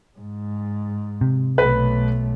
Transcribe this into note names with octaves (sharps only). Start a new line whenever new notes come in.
G#2
C3
B1 A3 B4